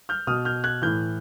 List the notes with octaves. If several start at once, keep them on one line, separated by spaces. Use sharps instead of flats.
F6 G6
B2 D#6 F6
F6 G6
F#6 G#6
A2 E3 F6 G6